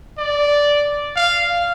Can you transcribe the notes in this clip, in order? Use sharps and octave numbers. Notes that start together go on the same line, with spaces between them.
D5
F5